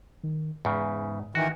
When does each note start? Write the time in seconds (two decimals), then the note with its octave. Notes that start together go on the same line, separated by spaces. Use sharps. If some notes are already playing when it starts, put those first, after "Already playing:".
0.23 D#3
0.65 E2 G#2 C#3
1.35 D#3 E3 F#4